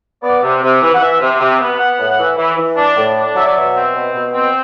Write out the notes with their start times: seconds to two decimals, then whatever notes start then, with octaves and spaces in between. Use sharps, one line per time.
0.23 B3 D5
0.43 C3
0.62 C3
0.82 E3
0.94 F#5
1.01 E3 E5
1.21 C3
1.40 C3
1.60 B3
1.79 B3 F#5
1.99 A2
2.19 E3
2.38 E3
2.57 E3
2.77 D4
2.96 A2
3.15 D4
3.35 F#3 E5
3.45 D5
3.55 B2 E5
3.75 C4
3.94 B2
4.14 B2
4.34 C4